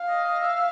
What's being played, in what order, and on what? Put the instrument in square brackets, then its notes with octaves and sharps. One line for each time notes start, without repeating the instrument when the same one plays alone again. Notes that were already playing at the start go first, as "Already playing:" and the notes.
Already playing: [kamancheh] F5
[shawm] D#5
D#5
E5
E5